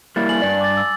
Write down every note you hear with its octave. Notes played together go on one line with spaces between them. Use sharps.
G3 A#3 E4 A6
G#5 F#7
G2 D5
D6 A6
E6